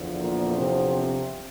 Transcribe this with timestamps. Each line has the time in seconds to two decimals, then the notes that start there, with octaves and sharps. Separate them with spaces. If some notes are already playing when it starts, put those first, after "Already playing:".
Already playing: E2 D3 F3
0.21 A#2 A#3
0.57 C3 C4